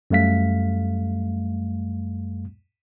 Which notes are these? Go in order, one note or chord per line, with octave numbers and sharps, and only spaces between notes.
F#2 G3 A3 F5 B6